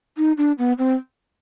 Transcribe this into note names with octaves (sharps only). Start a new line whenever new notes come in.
D#4
D4
B3
C4